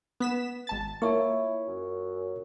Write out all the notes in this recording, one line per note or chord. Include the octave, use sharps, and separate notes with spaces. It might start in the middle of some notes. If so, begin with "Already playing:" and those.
B3 B6 E7
G#1 A5 A6
A#3 E4 F4 C#5 C#6
F#2